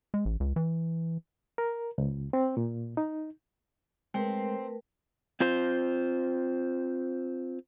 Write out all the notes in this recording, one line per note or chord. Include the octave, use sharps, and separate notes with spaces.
G#3
A1
C#2
E3
A#4
C#2
C4
A#2
D#4
G#3 A3 C4 A#4 B4
C4 F4 C5